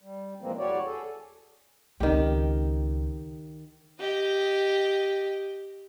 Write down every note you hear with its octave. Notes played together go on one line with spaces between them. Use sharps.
G3
A#2 E3 F3 G#3 A#3 C4
E2 G3 F#4 G4 C#5 D5
G#4 A4
C#2 D#3 C4 G4
G4 D#5